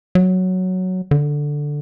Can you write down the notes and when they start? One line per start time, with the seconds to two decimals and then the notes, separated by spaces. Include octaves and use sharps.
0.15 F#3
1.11 D3